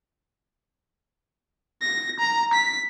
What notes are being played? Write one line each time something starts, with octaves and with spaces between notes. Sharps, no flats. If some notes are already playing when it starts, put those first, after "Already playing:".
A#6
A#5
B6